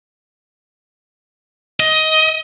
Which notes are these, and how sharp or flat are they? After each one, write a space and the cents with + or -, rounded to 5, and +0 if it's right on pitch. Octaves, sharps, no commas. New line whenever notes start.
D#5 +15